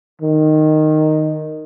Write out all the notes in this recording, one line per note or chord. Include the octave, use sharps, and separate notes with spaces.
D#3